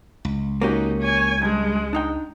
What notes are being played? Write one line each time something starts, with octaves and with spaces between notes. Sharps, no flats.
C#2
A#3 C#4 D#4 F#4 G4
C#5 G#5
G2 G3 G#3
D4 D#4 G5